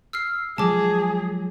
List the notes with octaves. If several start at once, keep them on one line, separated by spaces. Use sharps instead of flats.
E6 F6 C7
F3 F#3 G#3 G#4 A5 D6